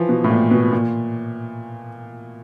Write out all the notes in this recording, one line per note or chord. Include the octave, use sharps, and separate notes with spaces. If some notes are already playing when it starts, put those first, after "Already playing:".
Already playing: E3 F3
B2
A2
A#2
B2
A#2